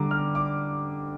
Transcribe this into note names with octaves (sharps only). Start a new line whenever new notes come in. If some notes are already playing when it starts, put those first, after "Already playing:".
Already playing: D3 G3 D4 A#5 D6
F6
D6